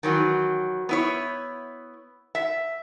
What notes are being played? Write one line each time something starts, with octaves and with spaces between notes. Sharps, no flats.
D#3 E3 F#3
B3 E4 C#5
E5